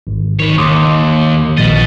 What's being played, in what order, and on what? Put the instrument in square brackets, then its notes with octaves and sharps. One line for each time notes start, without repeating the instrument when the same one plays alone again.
[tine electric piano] G#1
[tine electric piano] G#1 D#3 [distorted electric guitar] B4 C#5
[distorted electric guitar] D#2 [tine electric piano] C6 D6 D#6
[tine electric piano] A#1 A6 [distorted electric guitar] B4 D#5